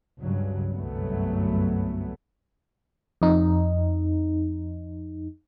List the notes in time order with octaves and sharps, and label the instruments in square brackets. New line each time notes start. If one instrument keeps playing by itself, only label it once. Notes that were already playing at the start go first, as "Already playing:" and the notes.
[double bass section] C#2 G2 C#3 F#3
G1 C2 F#2 F#3 A3 B3
[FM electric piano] F2 D#4